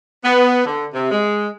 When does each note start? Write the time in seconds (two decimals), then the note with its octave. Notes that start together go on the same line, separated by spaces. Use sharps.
0.25 B3
0.65 D3
0.94 C3
1.12 G#3